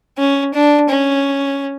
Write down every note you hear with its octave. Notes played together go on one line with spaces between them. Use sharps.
C#4
D4
C#4